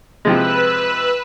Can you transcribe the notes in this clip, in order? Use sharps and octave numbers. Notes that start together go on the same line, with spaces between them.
C3 F3 G#3 B4 E6 F#6